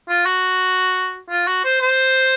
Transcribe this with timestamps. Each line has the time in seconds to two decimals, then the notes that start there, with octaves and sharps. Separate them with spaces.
0.09 F4
0.26 F#4
1.30 F4
1.47 F#4
1.65 C5
1.82 C5